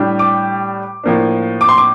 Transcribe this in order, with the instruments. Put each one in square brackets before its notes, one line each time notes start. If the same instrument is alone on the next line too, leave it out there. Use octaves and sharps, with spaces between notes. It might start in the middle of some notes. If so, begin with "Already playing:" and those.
Already playing: [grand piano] A2 G3 D4
D6
A2 F3 A#3 D4
D6
C6
D6